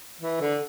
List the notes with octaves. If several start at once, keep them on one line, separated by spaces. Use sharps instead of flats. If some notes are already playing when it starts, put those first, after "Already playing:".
E3
D3